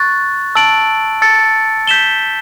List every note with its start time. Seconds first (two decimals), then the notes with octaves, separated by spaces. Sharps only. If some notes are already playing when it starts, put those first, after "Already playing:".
Already playing: C#6 F#6 A6
0.55 A5 E6 A6 D7 F#7
1.22 A5 E6 A6 C#7
1.87 G6 B6 E7 G7